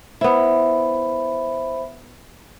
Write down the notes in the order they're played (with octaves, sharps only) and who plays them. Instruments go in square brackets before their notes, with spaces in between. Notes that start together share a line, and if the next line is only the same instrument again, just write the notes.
[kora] B3 E4 [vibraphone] C5 E5 B5